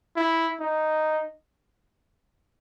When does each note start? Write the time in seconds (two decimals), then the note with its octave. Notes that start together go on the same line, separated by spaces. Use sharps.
0.16 E4
0.60 D#4